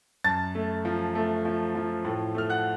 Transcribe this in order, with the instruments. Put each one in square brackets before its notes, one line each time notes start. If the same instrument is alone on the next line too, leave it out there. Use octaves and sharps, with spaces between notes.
[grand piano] F#2 A5 A6
A3
F3
A3
F3
F3
A2
A3 F6
F#5 F#6